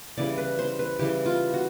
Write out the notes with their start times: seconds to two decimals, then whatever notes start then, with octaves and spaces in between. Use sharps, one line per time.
0.18 C#3 E3 G3 D5
0.38 B4
0.59 C5
0.79 B4
0.99 C#3 E3 G3 G4
1.26 F4
1.54 F#4